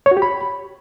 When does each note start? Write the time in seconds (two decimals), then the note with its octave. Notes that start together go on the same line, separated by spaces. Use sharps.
0.06 C#5
0.11 F#4
0.17 G4
0.22 B5